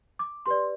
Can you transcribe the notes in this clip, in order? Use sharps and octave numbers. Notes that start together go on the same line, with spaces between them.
D6
G4 B4 D5 C6